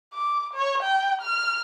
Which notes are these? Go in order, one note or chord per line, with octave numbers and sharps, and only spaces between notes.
D6
C#5
G5
F6